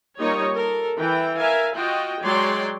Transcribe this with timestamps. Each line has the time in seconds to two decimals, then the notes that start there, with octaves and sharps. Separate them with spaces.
0.18 G3 A#3 D#4 F4 C#5 D#5
0.55 A4 A#4
0.97 E3 G5
1.37 A#4 E5 F5 G#5
1.75 F4 F#4 D#5 G5
2.22 F#3 G#3 C#5 D5 G5 C6